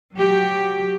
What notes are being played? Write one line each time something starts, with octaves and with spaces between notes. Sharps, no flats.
F#3 G4